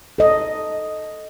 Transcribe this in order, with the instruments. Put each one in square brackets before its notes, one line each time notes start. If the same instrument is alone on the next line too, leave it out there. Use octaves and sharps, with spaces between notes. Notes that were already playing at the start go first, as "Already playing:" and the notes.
[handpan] A4 D#5